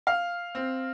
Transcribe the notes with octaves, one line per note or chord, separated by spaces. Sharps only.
F5
C4